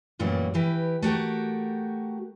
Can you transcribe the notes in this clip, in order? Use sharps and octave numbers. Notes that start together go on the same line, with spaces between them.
F#2 A#2 E3 G3 A3 F#4
E3 G4 B4
A3 F#4 G4 A#4